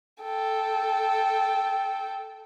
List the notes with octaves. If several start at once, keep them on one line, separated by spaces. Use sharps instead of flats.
A4 G5